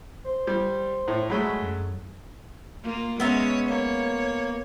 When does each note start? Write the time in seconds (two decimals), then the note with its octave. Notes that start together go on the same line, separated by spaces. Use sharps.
0.24 C5
0.47 G3
1.08 A2
1.30 F#3 G#3 A3 B5
1.62 F#2
2.83 A#3 F4 A#4
3.20 G#3 B3 C#4 C#5 E5 A#5
3.69 A#3 C#5